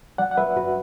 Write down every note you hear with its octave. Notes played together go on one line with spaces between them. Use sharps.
F#3 D5 F#5
F#5
F#3 B4 E5
F#2 F#4 B4